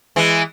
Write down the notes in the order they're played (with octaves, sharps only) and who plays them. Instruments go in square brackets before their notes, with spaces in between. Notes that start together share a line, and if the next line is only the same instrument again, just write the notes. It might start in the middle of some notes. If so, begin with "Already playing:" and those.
[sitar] E3 G#3